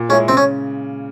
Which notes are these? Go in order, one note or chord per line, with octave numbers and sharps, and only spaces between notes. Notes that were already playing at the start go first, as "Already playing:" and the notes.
Already playing: A#2
G#3 C#4 E4 G#4
C#3 C4
C#4